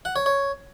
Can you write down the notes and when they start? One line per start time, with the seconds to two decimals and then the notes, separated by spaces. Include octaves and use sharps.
0.05 F#5
0.16 C#5
0.26 C#5